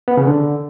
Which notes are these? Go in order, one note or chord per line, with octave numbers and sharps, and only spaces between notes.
B3
C#3
D3